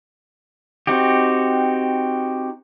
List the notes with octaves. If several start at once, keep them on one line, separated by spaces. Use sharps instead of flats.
C4 D#4 F#4 G4